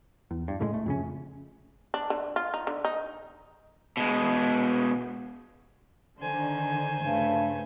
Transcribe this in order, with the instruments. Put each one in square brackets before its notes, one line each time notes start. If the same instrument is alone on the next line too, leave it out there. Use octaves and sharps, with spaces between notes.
[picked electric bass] E2
G2
C#2 A2 F3 G#3
A3
F2 C#3 C#4
[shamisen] D4
D3
F4
D#4
D3
D#4
[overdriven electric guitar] B2 G#3
[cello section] D3 D#3 [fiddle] C5 G#5
[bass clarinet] G2 [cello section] C#3 A3